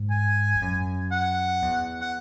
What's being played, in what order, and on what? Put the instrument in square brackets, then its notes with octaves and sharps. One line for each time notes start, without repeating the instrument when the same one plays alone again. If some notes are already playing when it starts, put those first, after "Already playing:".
Already playing: [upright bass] G#2
[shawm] G#5
[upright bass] G#2
F#2
[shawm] F#5
[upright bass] E2
[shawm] F#5